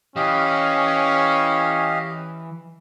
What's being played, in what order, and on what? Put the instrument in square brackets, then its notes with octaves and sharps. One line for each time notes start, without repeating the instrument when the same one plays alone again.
[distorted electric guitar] E3 [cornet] C#4 [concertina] G4 D#5 F5